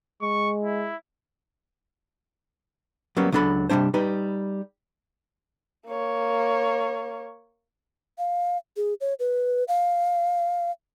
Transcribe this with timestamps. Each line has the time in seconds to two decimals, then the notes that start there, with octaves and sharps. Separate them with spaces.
0.22 G#3 C#6
0.64 E4
3.17 F#3 G3 A#3 B3 C#4
3.32 C#2 F#3 D4 A4 B5
3.69 C3 D#3 G3 D4 C5
3.94 G3 D#4 B4
5.86 A#3 C#5
8.18 F5
8.77 G#4
9.01 C#5
9.19 B4
9.68 F5